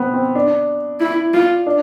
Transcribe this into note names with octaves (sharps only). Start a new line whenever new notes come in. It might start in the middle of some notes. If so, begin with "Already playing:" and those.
Already playing: B3 C4
C4
D4
E4
F4
D4